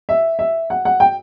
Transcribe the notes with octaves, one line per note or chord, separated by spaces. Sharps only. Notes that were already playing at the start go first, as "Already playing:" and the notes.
E5
E5
F#5
F#5
G5